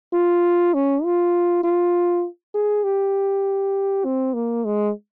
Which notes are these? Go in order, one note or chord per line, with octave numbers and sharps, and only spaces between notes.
F4
C#4
F4
F4
G#4
G4
C4
A#3
G#3